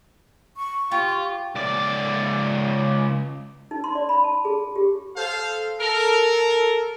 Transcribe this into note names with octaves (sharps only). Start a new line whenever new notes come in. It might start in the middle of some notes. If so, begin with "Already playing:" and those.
C#6
F4 G4
C#2 D5
D#4
C6
D5
B5
A5
G#4
G4
A4 C5 F5
A4 A#4